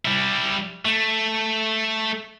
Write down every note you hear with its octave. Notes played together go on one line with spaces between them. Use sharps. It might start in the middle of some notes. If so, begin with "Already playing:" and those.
G3 E4
A3